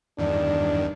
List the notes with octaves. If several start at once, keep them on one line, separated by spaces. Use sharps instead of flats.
E2 G2 D#3 D4